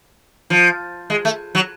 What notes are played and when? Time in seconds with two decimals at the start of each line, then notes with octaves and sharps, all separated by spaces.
0.50 F3
1.10 G#3
1.25 A3
1.55 F#3